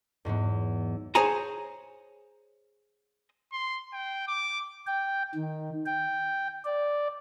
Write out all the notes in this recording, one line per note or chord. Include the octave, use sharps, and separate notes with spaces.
E2 G#2 F#3 B3
G#4 C5 C#5 G#5 A#5
C6
G5
D6
G5
D#3
G5
D5